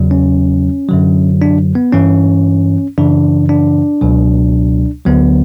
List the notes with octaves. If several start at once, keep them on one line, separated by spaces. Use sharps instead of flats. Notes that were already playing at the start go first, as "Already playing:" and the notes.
Already playing: E2 C#3 F#3
C#4
F#2 D3 F#3
D4
B3
G2 E3 C#4
F#2 C#3 E3 D4
D4
C#2 B2 F#3
D2 D3 F#3 B3